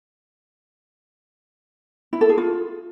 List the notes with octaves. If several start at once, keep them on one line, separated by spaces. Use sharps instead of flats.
E4
A4
G#4
F4